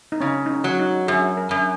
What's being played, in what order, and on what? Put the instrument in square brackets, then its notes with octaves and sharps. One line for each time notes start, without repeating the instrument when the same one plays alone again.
[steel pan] D#4
[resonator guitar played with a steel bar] C#3 [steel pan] C#4
[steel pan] D#4
C#4
[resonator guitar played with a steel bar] F#3
[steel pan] D#4
[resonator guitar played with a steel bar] F#2 [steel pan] G#4
[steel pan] A#4
[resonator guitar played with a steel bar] F#2